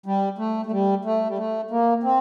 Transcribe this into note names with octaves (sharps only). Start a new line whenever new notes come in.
G3
A3
A3
G3
A3
G3
A3
A#3
C4